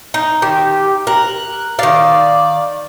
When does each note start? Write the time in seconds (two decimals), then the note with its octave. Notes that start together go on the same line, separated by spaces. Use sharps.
0.14 D#4
0.42 D#3 G4
1.07 A#4 F#6
1.79 D#3 D5 F5